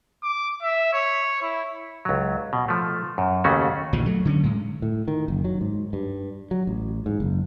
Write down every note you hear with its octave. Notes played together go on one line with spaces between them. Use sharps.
D6
E5
C#5
E4
C#2 F#3
B2
F3 A3
F#2
D#2 C#3 A3 C#4 F#4
A#1 D#2 D3 F3
F#3 A3
D3 F#3 G#3 C#4
A2 G#3
A2
D#3
F#1
F#3
G#2
G2
F#3
A1
G#2
F#1